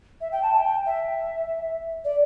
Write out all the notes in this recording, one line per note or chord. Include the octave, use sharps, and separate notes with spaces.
E5
G5
A5
A5
G5
E5
D5